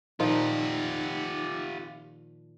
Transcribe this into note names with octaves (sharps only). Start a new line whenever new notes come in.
A#2 D#3 F3 F4 G4